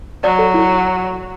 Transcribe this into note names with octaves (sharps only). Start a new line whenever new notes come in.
F#3 D5
A4
E4